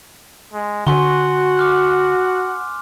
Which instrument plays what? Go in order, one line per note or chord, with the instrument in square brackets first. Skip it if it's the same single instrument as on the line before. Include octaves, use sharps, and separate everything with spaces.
[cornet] G#3
[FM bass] D3 [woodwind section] F#4 [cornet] F#5 [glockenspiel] G#5 C6 G7
[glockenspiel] D6 F6 F#6